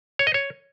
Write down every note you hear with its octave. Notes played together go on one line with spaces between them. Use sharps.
C#5
D#5
C#5